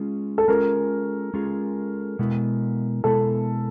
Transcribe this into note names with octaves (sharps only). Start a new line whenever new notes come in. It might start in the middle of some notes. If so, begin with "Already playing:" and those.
Already playing: G#3 C#4 F4 G#4
A4
G#3 C#4 F4 G#4 A#4
G#3 C#4 F4 G#4
B2 G#3 B3 E4
B2 G#3 B3 E4 A4